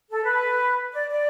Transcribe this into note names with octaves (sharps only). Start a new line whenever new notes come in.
A4
B4
D5
D5